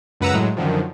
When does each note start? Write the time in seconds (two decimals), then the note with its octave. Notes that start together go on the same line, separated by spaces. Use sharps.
0.20 C#2 F#2 B4 F#5 A#5 E6
0.33 A2 F#3 G#3
0.57 F#2 D3 D#3 F3